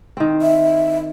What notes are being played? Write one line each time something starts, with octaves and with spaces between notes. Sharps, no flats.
D#3 C4
E5